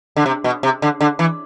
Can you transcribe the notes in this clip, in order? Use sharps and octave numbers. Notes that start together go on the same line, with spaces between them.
D3
C3
B2
C3
D3
D3
E3